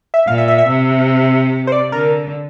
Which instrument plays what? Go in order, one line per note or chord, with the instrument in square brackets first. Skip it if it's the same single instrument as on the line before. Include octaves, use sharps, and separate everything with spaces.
[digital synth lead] E5
[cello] A#2 [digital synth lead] F5
[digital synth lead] E5
E5
E5
[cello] C3
[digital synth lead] C5
D5
[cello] D3 [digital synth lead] A#4